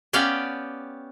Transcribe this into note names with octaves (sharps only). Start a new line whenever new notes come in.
B3 C#4 G4 D5 F5 G5